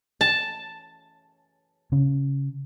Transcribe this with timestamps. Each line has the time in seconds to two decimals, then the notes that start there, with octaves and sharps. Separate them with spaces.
0.21 A5
1.92 C#3 C#4